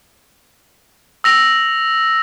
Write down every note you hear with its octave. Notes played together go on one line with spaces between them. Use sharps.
E6 A#6 F7